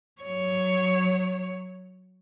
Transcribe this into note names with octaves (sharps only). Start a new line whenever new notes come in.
F#3 C#5